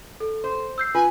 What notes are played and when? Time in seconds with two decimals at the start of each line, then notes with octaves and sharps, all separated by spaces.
0.20 A4
0.44 C5
0.78 E6 G6 C7
0.95 F4 B4 G#5